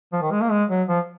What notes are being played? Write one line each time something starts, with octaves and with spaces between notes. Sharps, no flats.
F3
D#3
G#3
A#3
G#3
F#3
F3